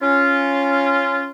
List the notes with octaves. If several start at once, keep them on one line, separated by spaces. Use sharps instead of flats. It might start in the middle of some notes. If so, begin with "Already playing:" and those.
C#4 F4